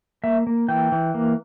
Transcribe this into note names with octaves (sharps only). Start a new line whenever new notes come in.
A#3 E5
A#3
E3 G5
E3
A#3